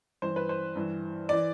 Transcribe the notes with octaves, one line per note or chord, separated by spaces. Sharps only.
G2 E3 C5
B4
C5
G2 E3
E3 D5